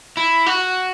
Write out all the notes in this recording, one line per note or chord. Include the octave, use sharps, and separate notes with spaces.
E4
F#4